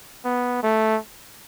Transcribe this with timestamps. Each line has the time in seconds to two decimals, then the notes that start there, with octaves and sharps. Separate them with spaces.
0.25 B3
0.63 A3